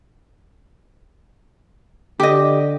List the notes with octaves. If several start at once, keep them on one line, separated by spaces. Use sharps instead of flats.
D3 G4 D#5